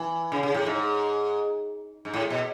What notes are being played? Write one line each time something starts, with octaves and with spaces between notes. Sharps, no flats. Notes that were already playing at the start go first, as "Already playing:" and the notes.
Already playing: E3
C#3
C#3
A2
G#2
G#2
A2
B2